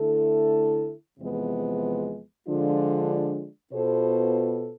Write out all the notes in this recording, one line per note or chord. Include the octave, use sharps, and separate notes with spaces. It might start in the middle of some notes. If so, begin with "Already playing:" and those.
Already playing: D3 A3 E4 A4
E2 C3 F3 G#3 B3
D3 F3 G#3 D4 F4
B2 B3 F4 A4 C5